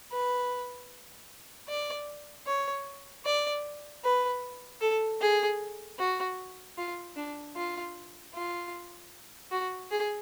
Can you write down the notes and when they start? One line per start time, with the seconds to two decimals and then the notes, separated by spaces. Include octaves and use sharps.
0.12 B4
1.69 D5
2.47 C#5
3.25 D5
4.04 B4
4.81 A4
5.21 G#4
5.99 F#4
6.78 F4
7.16 D4
7.56 F4
8.35 F4
9.51 F#4
9.91 G#4